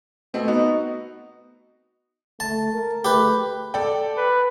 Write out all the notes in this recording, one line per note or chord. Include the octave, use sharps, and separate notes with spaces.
B2 A3 C4
B3 D#4 F#4
A3 A5
A#4
A3 G4 B4
A4 D5 G5
B4